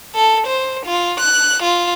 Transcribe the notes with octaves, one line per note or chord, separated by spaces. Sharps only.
A4
C5
F4
F#6
F4